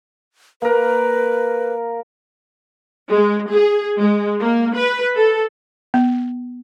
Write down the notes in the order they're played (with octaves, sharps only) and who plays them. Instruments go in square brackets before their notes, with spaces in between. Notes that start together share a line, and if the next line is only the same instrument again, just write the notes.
[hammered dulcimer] A#3 A#4 [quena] B4
[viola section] G#3
G#4
G#3
A#3
B4
A4
[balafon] B3